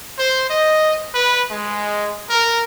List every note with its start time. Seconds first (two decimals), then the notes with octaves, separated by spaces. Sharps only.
0.17 C5
0.50 D#5
1.14 B4
1.51 G#3
2.29 A#4